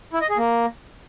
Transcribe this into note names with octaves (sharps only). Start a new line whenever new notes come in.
E4
D#5
G#4
A#3